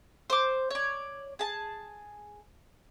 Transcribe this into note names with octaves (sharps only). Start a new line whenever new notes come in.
C5 D6
C#5 D5
G#4 A5